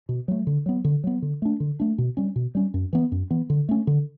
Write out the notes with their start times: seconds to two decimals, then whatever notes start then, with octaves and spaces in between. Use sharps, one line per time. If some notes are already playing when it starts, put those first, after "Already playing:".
0.09 B2
0.28 F#3 A3
0.47 D3
0.66 F#3 B3
0.84 D3
1.04 F#3 B3
1.22 D3
1.42 A3 D4
1.60 D3
1.80 A3 D4
1.98 B2
2.17 G3 C#4
2.36 B2
2.55 G3 C#4
2.74 F#2
2.93 E3 B3
3.12 F#2
3.31 E3 B3
3.50 D3
3.69 A3 C#4
3.87 D3